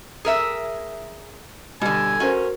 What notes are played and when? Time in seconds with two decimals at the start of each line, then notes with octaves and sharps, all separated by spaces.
0.25 G#4 A#4 E5
1.82 B2 D3 G3 G#5
2.20 C#4 F#4 A#4 C5